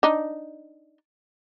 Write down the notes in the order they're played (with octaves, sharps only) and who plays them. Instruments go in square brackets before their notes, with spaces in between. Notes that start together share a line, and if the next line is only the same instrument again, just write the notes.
[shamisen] D4 D#4